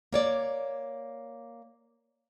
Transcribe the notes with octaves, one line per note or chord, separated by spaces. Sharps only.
A#3 C#5 D5